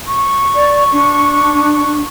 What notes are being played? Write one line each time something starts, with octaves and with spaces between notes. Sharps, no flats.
C#6
D5
D4